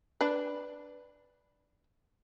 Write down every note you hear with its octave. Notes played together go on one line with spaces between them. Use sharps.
D4 B4